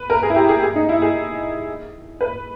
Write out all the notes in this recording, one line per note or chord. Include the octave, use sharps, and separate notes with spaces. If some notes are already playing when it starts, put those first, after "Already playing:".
Already playing: B4
A#4
G#4
E4
G4
G#4
G#4
D#4
E4
G#4
B4